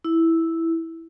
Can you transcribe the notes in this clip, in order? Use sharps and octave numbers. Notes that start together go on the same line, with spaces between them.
E4